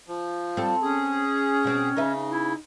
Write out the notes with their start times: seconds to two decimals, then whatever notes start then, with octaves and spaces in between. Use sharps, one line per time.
0.08 F3
0.57 G3 C4 A4
0.82 C#4 G#4
1.64 B2 C4
1.97 C#3 D#4 B4 E5
2.30 E4